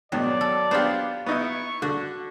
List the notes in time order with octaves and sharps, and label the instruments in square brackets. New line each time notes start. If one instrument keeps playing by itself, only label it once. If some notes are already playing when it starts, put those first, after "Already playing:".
[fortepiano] G#2 B2 D#3 [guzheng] F#3 [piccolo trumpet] D5
[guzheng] A4
[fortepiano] B3 D4 G4 [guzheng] F4 C5
[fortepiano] B3 D#4 E4 [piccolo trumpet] C#6
[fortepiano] D3 [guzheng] F#4